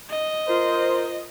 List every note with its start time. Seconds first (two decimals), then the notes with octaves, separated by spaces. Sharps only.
0.10 D#5
0.47 F4 A#4 C5